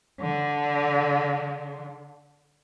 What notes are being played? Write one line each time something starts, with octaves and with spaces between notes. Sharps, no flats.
D3